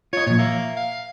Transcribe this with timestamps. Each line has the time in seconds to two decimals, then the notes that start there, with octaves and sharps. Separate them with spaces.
0.13 F4 C#5 D#5
0.27 A#2 F3 C#5
0.39 A#3 E5
0.77 F5